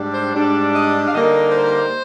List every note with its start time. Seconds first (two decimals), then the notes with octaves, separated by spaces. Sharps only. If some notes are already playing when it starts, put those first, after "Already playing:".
Already playing: G#2 G3 D4
0.13 C5
0.33 G#2 G3 D4
0.73 D#5
1.07 F5
1.12 D3 G3 A#3 D#4 D#5
1.51 C5